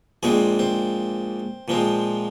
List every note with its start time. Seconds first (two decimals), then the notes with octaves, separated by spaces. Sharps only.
0.23 A#1 A#2 G#3 C4 G#4
0.59 C4
1.68 A#2 F3 G#3 C4